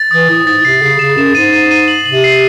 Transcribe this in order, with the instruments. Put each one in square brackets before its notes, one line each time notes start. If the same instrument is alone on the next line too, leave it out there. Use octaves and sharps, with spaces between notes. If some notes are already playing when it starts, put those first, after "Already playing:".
Already playing: [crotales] A6
[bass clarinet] E3 [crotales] D#6
[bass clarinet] A2 [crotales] D#6
[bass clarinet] G#2 [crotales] A6
[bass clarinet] C3 [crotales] C7
[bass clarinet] C#3 [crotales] C7
[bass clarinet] C#3 [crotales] E7
[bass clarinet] F#2 [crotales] E7
[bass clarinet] G#2 [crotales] D#7
[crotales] D#7
D#7
F#7
[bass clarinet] C3 [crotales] F#7
[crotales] C7